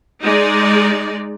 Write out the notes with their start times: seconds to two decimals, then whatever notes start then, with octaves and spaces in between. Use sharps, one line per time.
0.21 G#3 D#4 D5